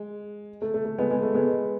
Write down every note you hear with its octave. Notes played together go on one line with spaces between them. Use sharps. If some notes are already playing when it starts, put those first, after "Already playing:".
Already playing: G#3
A3
A3
A3
G#3 B3
G#3
A3
G#3 B3